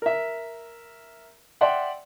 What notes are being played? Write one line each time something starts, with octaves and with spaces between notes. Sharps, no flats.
A#4 E5
D5 E5 F#5 G5 C6